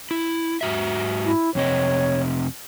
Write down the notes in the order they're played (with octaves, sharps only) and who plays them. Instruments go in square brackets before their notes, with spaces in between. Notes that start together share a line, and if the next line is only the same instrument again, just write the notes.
[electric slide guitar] E4
G#2 F#4 E5
[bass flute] E4
[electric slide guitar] F2 C3 D#5 [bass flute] C#5